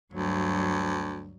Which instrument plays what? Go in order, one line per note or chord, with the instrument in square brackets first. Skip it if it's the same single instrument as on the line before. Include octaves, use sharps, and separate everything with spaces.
[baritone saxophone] D2 [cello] G2 F#3